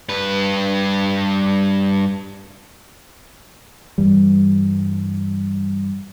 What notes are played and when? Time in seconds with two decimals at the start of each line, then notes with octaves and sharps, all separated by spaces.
0.09 G2 B4
3.98 G2 E3 G3